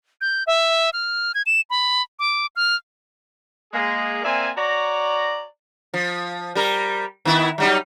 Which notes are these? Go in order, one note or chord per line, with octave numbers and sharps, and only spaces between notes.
G6
E5
F6
G#6
E7
B5
D6
F6
G#3 A#3 G#4
A#3 C4 D5 E5 G#5
F#4 C#5 D5 A#5
F3
G3 A#4
D#3 B3 E4
F#3 G3 D#4